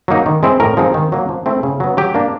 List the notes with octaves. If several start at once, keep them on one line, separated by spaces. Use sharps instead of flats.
F#3 A#3 D#4
D#3
G#3 C4 E4
A2 A#4
F3 G#3 C4 D#4
D#3
F#3 A#3
F3
A3 C4 E4
C#3
F#3 B3
F#3 G4
A#3 D4